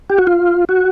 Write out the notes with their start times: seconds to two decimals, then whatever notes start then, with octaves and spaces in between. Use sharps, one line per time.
0.10 G4
0.18 F#4
0.27 F4
0.69 F#4